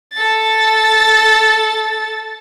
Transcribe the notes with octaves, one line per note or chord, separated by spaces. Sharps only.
A4 A6